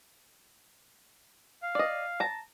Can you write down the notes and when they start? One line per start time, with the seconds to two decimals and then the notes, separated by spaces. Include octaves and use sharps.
1.63 F5
1.75 D5 D#5
2.20 A5 A#5